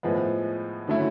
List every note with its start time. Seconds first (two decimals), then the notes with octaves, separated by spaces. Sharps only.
0.03 A2 F3 G#3 B3
0.88 D3 F#3 A3 C#4 E4